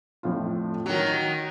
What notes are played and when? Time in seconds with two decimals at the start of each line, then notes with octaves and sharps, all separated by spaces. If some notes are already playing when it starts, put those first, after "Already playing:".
0.23 F2 A2 F4
0.86 D#3 F#3 F#4